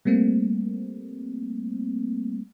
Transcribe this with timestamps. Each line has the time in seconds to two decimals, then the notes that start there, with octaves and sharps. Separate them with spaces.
0.05 G3 A3 A#3 C4